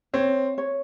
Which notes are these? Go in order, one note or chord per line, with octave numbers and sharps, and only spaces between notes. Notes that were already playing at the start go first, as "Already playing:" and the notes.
C4 C#5
C#5